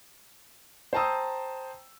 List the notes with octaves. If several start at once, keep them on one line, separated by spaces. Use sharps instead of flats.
C5 G5 A5 A#5 D#6 E6